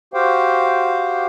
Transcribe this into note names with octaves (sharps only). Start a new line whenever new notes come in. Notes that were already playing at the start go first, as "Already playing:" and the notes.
F#4 G4 C5 F5 G5